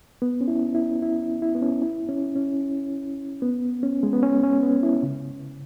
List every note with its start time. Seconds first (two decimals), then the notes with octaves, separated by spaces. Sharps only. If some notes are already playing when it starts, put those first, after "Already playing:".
0.22 B3
0.41 C#4
0.48 E4
0.75 E4
1.02 E4
1.42 E4
1.55 B3
1.61 C#4
1.82 E4
2.09 C#4
2.36 C#4
3.42 B3
3.83 C#4
4.03 G#3
4.13 B3
4.23 C#4
4.43 C#4
4.63 B3
4.83 E4
5.03 C#3